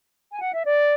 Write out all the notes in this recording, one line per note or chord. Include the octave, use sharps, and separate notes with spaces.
G#5
F#5
E5
D5